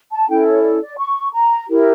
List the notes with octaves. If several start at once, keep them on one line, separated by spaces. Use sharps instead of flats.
A5
C#4 E4 A4 G5
C#5
D5
D5
C#6
A#5
E4 G4 A#4